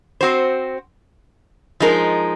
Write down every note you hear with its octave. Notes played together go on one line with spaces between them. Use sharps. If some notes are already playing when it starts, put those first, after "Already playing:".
C4 F#4 C5
F3 G#3 D#4 A#4